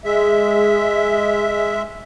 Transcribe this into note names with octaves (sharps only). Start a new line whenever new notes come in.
G#3 G#4 E5